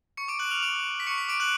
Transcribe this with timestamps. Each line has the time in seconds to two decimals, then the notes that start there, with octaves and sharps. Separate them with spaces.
0.17 C#6 C#7
0.28 D6 D7
0.39 F#6 F#7
0.51 F6 F7
0.62 D6 D7
1.00 B6
1.07 C#6 C#7
1.18 B6
1.29 D6 D7
1.40 F#6 F#7